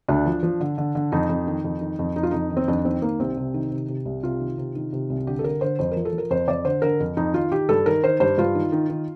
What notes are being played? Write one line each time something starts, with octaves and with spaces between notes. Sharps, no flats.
D2 D4
F3
F3
D3
D3
D3
F2 D#4
F2
D#3
F2
D#3
F2
F2 D#4
F4
F2 D#4
D#3
C4
F2 D4
D#3 C4
D#3 A#3
C2 C4
C3
D#3
C3
C3
C2
C3 F4
D#3
C3
D#3
C3
C2
D3 G4
A4
D3 A#4
D3 C5
F2 C5
A#4
F3
A4
F3
A#4
F2 C5
F2 D5
D3 C5
D3 A#4
F2
F2 D#4
D#3 F4
D#3 G4
G2 A4
D#3 A#4
D#3 C5
G2 C5
G2 F4
D#3
D#3
D#3